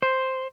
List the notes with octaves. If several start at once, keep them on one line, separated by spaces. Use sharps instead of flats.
C5